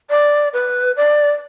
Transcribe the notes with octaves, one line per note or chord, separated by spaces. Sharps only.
D5
B4
D5